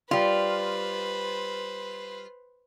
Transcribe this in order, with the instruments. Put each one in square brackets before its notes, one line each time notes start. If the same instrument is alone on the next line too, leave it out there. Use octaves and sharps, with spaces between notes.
[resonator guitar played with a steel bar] G3 F4 [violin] B4 C5